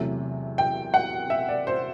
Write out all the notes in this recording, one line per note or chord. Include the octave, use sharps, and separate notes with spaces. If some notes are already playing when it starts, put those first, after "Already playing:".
Already playing: E2 C3 F#3 A3
G5
F#5
E5
D5
C5